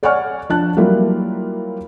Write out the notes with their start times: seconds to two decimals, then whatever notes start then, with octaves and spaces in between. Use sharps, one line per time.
0.03 C#5 D5 F#5 G#5 C#6 F6
0.49 F3 D4 A5 F#6
0.77 F#3 G3 A#3 E4 F4